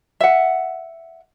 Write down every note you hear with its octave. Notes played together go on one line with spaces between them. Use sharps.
E5 F#5